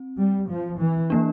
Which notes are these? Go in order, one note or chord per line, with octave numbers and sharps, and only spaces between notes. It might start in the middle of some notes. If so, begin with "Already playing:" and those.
Already playing: C4
G3
F3
E3
E3 A#3 D4